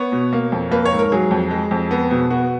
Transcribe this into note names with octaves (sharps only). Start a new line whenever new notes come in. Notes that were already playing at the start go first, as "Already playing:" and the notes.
Already playing: B3 C#5
B2
A#3
F2
A#3 B4
C#5
G#2
A#4
F#3 G#4
F2
G#3
F2
B3
B2
B3 F#4